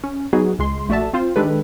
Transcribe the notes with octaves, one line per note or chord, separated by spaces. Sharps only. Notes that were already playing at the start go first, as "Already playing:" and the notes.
C#4
F#3 B3 D#4 F#4 G#4
C#2 G#3 C6
A#1 A3 F#4 D5 E5 A5
C4 F4 C5
D#3 G#3 D4 G4 A4 B4